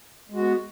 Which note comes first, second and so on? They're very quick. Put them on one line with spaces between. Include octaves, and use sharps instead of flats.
G#3 F#4 B3